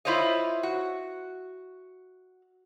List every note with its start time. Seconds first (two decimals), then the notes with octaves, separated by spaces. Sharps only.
0.05 E4 F4 C5 C#5 D#5
0.63 F#4